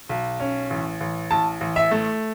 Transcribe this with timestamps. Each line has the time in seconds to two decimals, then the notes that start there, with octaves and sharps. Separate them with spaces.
0.09 B1
0.40 C#4
0.70 A1
1.00 A1
1.31 A1 A5
1.61 A1
1.76 E5
1.91 A3